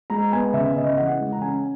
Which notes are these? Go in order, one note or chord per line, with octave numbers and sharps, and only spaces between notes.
G#3 A#5
B3 G#5
C#3 E5
C#3 D#5
E3 F#5
G#3
A#5
C#4 G#5